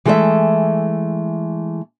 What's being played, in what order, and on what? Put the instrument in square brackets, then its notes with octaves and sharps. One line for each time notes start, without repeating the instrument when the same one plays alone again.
[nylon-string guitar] E3 G#3 A3 A4 C#5 E5